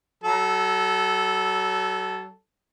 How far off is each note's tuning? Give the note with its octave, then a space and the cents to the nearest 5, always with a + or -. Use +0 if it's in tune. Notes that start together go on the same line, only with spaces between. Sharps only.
F#3 +35 A4 -10